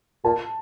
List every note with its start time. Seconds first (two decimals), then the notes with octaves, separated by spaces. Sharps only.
0.24 A#2 A5